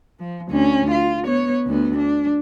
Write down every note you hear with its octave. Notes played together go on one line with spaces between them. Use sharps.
F3
D2 C#4
F4
B3 C#5
D2 B3
D4